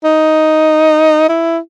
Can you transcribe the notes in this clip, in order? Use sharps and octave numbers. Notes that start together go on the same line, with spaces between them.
D#4
E4